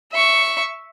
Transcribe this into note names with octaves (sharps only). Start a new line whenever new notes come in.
E5 C#6